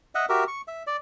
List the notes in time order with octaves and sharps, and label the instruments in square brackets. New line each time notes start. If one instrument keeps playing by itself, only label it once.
[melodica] D#5 E5 F#5
F#4 G4 A#4 E5
C#6
E5
D5